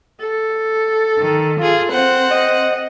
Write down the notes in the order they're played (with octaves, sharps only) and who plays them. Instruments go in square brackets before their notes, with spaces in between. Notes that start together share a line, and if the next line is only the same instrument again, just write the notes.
[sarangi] A4
[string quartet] D#3
F4 G#4
C4 C5 F#5
[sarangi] D#5